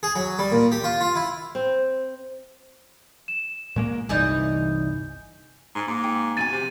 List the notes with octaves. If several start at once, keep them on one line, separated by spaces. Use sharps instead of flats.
G#4
F#3
G3
A#2
G4
F4
F4
E4
C4
E7
A#2 G#3 A#3
G1 C2 E3 D#4 D5 G#5 G6
G#2
G#2 A#3
G5
F2 B2 G#5 A6 D#7
C3